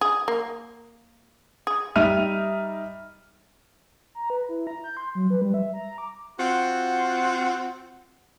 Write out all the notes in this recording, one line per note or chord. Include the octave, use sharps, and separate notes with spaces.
G#4
A#3
G#4
G3 D#4 E5 F6 D#7
A#5
B4
E4
A#5
G6
C6
F#3
B4
G3
E5
A#5
D6
C4 F4 F#4 F#5